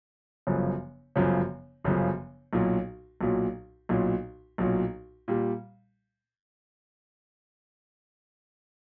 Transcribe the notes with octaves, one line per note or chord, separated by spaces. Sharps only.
G1 F#2 C#3 F3
G1 F#2 C#3 F3
G1 F#2 C#3 F3
B1 A#2 F#3
B1 A#2 F#3
B1 A#2 F#3
B1 A#2 F#3
A#2 G3